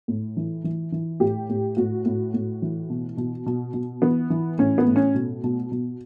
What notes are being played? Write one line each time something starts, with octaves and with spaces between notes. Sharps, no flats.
A2
E3
E3
E3
A2 G4
A2
A2 F#4
A2
A2
E3
B2
B2
B2
B2
E3 B3
E3
A2 C#4
B3
A2
C#4
B2
B2
B2